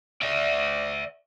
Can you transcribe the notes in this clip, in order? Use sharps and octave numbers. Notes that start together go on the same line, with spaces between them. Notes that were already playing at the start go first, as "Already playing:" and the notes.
D5 E5